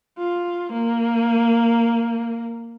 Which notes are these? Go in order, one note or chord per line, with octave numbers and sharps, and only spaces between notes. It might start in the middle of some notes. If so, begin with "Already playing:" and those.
F4
A#3